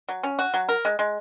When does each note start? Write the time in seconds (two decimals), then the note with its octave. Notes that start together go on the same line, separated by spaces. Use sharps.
0.09 F#3
0.23 C#4
0.39 F#4
0.54 F#3
0.69 A#4
0.85 G#3
0.99 G#3